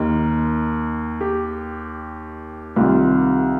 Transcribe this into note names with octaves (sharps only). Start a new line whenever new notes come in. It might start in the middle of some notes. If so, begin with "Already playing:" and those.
Already playing: D#2 D#3 A#4
G4
C2 C3 D#3 F4